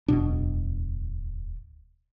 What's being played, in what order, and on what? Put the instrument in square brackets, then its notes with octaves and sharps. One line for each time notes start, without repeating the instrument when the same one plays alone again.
[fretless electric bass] D1 E2 B2 D4